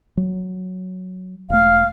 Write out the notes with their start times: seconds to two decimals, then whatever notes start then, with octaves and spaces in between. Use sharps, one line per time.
0.17 F#3
1.50 E1 A3 F5